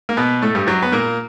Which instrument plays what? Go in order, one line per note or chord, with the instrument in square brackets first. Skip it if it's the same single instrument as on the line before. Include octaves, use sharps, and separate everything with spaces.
[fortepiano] A#3
B2 B3
A2 A3
G2 G3
F#2 F#3
B3
A#2 A#3